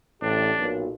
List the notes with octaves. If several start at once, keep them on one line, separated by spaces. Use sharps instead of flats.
A1 A2 D4 G4
B1 A#2